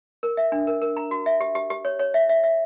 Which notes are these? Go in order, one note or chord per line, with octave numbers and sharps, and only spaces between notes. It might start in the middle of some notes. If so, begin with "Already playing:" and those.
A#4
E5
D4
A#4
A#4
A#5
F#4
E5
G4
G4
G4
C#5
C#5
E5
E5
E5